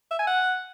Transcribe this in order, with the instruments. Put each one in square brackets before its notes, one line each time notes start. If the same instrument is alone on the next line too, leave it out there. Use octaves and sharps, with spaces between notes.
[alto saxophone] E5
G#5
F#5